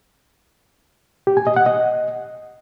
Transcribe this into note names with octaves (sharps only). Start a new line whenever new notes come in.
G4
G#5
D#5
F#5
D#5